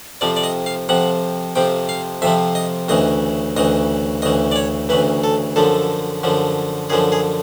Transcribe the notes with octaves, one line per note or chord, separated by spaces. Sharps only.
F2 C3 F3 D5
D5
D#5
F5
F2 C3 F3 F#5
F2 C3 F3 G5
F5
F2 C3 F3 E5
D#5
D2 C#3 E3 D#5
D2 C#3 E3 D#5
D2 C#3 E3 D#5
D5
C#5
D2 C#3 E3 B4
A4
F#2 D3 F3 A4
F#2 D3 F3
F#2 D3 F3 G#4
G#4